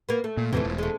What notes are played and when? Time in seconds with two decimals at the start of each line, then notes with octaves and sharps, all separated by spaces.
0.09 A#3 B3
0.24 A3
0.37 A#2
0.53 E2 A2 C3 E3 F3 A3
0.64 E1
0.78 G#3 A3